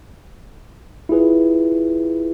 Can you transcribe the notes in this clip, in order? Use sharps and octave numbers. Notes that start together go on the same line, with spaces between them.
E4 F4 G#4 B4